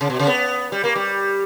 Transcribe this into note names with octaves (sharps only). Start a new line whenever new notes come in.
C#3
B2
C#3
B3
G3
A#3
G3